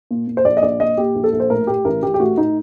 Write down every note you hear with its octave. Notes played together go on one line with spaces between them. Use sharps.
A#2
A#2
C5
A#1 D5
D#5
A#1 D5
A#2 D#5
A#2 G4
A#1
A4
A#1
C5
A2 A#4
A2 G4
A1 A#4
A1 G4
G4
A2 F#4
A2 D#4